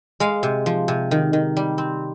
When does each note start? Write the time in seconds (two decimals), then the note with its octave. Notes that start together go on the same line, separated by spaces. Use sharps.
0.20 G#3 F5
0.43 C3
0.66 F3
0.88 C3
1.11 D#3
1.33 D#3
1.57 G3
1.78 C4